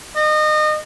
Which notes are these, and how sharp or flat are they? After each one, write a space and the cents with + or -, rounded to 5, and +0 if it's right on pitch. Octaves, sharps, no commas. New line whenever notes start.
D#5 -30